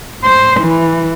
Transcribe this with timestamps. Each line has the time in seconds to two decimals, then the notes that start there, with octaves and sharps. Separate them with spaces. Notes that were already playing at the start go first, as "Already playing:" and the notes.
0.24 C5
0.61 E3